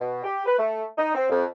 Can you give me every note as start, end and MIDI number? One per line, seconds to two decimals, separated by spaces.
0.01 0.24 47
0.24 0.42 67
0.46 0.54 71
0.59 0.84 57
0.98 1.10 63
1.15 1.24 60
1.29 1.45 41